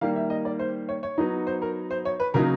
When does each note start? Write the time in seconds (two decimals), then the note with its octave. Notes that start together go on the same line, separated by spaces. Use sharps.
0.01 D#3 G3 A#3 F5
0.16 E5
0.30 D#5
0.45 D5
0.59 C5
0.89 C#5
1.03 C#5
1.18 F#3 B3 D#4
1.47 C5
1.62 A#4
1.91 C5
2.05 C#5
2.20 B4
2.34 C#3 F#3 A#3 D#4 A#4